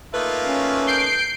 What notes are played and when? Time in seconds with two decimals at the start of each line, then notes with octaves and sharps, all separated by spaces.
0.14 A3 A#3 D#4 F4 B4 E5
0.43 C#4
0.87 G6 C7 D7